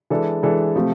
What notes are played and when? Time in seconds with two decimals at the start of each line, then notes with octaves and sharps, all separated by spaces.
0.10 E3 G#3 D4 A4
0.43 E3 G#3 D4 A4
0.75 C3 F3 A3 C4